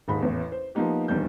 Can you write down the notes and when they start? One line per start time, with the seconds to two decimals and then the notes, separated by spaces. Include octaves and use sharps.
0.08 D#1 G#2 B5
0.22 A1 E2
0.52 C5
0.75 F3 A#3 B3 D#4 G4
1.08 D#1 E2 D#3 G3 D4 G6